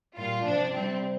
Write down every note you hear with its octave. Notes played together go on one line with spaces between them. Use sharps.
A#2 G3 F4
C3 F3 D4
C3 G3 C4